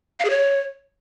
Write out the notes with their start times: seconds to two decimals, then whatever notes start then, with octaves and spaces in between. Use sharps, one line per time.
0.20 F5
0.25 G#4
0.30 C#5